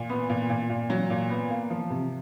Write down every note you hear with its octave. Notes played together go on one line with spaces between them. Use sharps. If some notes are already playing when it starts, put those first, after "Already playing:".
Already playing: A#2
B3
A#2
A#2
A#2
F#3
A#2
B3
A#3
F3
C3